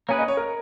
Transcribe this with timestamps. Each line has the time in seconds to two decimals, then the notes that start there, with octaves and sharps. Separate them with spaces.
0.08 A#3 C#4 G#4 B4 C#5
0.18 D#5
0.28 C#5
0.37 A#4